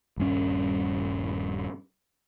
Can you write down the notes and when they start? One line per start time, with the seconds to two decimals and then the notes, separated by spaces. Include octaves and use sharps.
0.18 D#1 G2 C#4